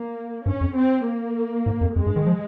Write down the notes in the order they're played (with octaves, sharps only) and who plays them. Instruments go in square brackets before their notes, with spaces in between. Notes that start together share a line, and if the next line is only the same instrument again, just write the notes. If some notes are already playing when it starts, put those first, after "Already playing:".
Already playing: [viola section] A#3
[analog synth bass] G2 [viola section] C#4
[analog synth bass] F2
[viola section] C4
A#3
[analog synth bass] G#2
F2
[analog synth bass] F2 [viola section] G#3
[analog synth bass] G2
D#3
F3